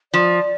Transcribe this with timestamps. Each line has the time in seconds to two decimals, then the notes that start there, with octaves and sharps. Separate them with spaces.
0.13 F3 D5